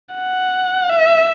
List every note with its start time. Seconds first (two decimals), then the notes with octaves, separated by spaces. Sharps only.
0.15 F#5
0.90 E5